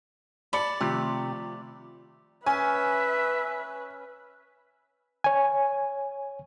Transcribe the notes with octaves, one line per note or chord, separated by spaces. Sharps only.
D5 A5 B5 C#7
C3 D#3 F3 A3 G4
C#4 B4 E5 G#5
C#5 G#5